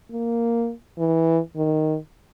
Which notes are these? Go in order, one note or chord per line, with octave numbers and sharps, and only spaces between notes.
A#3
E3
D#3